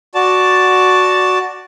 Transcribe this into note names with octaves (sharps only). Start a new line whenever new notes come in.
F#4 D5 A5